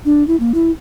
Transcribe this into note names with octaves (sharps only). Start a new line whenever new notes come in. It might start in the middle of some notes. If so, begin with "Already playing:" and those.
D4
E4
A#3
E4